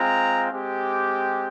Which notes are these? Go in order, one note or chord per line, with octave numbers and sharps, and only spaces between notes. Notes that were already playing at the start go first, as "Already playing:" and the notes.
Already playing: G#3 C4 F4 A#5
G#3 C4 G4